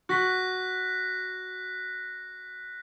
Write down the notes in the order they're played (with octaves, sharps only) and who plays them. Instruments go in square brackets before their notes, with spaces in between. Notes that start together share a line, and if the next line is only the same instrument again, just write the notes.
[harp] F#4 [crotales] F#6 A#6 B6